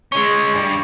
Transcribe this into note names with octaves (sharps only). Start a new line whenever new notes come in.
G#3 C#4 C#6
G2